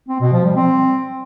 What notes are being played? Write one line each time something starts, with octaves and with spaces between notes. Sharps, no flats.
C4
B2
F3
G3
C4